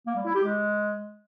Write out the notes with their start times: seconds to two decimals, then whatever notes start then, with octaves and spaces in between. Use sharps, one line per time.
0.07 A#3
0.16 G3
0.25 E4
0.35 G4
0.44 G#3